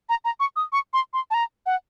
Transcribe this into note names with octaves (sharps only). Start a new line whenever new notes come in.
A#5
A#5
C#6
D#6
C#6
C6
C6
A5
A#5
F#5